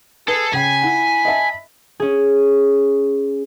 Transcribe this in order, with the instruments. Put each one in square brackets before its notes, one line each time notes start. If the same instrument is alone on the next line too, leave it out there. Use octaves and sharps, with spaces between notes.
[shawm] G#4 [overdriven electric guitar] A4 [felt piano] B4
[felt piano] C#3 G5 C7 [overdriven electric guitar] G#5 [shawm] B5
[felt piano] E4 F#5
D#5 E5 A5
[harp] C#4 G#4